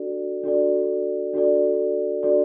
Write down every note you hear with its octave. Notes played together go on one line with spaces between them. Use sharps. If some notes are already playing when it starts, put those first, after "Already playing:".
Already playing: D4 F#4 A4 D5
D4 F#4 A4 D5
D4 F#4 A4 D5
D4 F#4 A4 D5